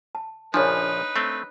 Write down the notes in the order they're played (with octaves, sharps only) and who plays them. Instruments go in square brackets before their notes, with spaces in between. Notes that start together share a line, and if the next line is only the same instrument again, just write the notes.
[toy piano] A5
[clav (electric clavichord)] A#1 C#3 F3 [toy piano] D4 C#5 [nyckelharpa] D#4 B4
[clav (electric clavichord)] A3 C4